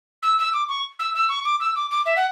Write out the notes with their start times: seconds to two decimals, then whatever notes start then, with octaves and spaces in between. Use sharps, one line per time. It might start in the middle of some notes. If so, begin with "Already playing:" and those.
0.22 E6
0.38 E6
0.53 D6
0.68 C#6
0.99 E6
1.14 E6
1.29 C#6
1.45 D6
1.60 E6
1.75 D6
1.90 D6
2.06 E5
2.16 F#5